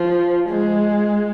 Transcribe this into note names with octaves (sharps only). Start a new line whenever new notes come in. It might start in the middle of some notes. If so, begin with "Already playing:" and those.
Already playing: F3
G#3